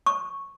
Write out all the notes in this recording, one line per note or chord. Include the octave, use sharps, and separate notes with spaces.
C#6